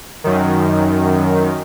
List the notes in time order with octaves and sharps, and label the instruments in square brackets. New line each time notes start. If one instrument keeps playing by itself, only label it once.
[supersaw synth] F#2 D#3